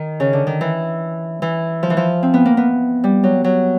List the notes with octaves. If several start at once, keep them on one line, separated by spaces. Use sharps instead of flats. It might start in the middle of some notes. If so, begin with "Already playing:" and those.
Already playing: D#3
C#3
D3
D#3
E3
E3
F3
E3
F3
C4
B3
A#3
B3
G3
F#3
F#3